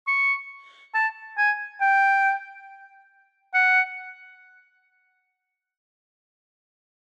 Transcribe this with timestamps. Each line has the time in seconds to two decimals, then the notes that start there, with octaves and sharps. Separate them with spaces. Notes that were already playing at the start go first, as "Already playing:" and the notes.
0.07 C#6
0.94 A5
1.37 G#5
1.81 G5
3.54 F#5